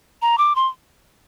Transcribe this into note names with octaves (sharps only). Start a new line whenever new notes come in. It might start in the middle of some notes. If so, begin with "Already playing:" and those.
A#5
D6
C6